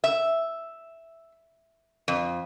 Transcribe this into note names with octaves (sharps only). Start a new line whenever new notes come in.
E5
F2